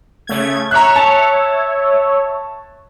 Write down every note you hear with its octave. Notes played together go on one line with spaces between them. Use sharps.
C#3 A3 G#6
C#5 E5 A#5 F#6
A5